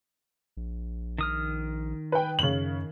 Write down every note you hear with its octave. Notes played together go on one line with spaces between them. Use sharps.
A#1
D#3 D#6 F6
B4 G5
F#2 C#3 F#7